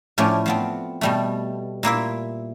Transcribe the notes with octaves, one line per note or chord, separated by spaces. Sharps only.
A2 F3 A3 C#4 D5
F3 B3 C4
B2 G3 A3
A#2 A#3 E4 E5